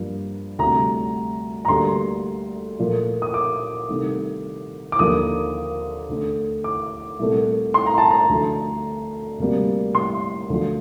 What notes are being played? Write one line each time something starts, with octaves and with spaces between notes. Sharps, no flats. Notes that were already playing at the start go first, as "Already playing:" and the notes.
Already playing: G2 F3 A#3
D2 C3 G3 A#5
A#5
D2 D3 G3 A#3 C6
A#2 F3 A3
D#6
D6
C2 C3 D#3 A3
D6
D#2 D3 F3 A#3 D#6
D2 D3 A3
D6
C2 A#2 A3
C6
A#5
A5
A#5
D2 D3 F3 A3
D2 C3 G3 A#3
C6
D2 D3 F3